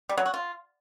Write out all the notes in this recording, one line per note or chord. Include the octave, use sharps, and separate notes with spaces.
G3
F#3
F#4
F4